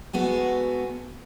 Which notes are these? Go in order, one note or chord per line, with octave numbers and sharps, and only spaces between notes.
G#3 A3 B3 F#4